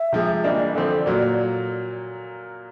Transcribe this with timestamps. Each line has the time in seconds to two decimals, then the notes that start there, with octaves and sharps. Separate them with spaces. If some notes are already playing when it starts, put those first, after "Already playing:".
Already playing: E5
0.13 C3 F3 G#3
0.44 E3 G3 A#3 D4 D#5
0.60 D5
0.75 D3 F3 A3 C4
1.06 A#2 F#3 A#3